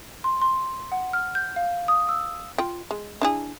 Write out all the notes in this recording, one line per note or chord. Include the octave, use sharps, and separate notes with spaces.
C6
C6
F#5
F6
G6
F5
D#6
E6
F4 G5
G#3
D4 E4 G#4